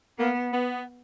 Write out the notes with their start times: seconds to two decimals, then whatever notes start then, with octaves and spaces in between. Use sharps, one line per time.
0.19 A#3 B3
0.53 B3